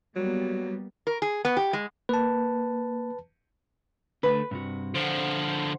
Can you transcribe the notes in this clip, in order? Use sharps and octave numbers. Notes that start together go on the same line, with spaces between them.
F#3 G3 A#3 B3
A#4
G#4
B3
G4
G#3
A#3 B4 A5
D3 A3 B4
G2 C3 F#4
D3 F3 C5 F#5